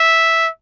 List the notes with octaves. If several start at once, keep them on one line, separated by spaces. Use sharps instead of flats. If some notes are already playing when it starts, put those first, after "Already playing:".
Already playing: E5